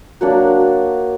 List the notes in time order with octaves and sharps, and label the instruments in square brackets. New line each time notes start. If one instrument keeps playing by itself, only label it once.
[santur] F#3 A#3 D4 F#4